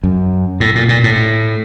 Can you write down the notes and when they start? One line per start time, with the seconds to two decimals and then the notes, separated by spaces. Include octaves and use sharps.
0.04 F#2
0.60 A2
0.75 A#2
0.89 A#2
1.04 A2